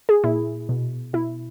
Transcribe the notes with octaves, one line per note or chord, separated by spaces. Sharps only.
G#4
A#2 E4
B2
B2 E4